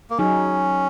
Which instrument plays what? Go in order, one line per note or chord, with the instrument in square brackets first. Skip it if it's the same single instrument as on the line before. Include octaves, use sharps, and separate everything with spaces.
[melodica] A#3
[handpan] F#3 D#4 G#4 [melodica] C#4